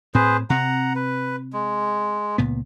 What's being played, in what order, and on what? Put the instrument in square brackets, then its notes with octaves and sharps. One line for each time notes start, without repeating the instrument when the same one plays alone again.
[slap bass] A2 C4 [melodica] G#4 B4 C5
[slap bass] C3 C4 [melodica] F#5 A#5
[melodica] B4
G#3
[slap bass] C#2 A#2 B3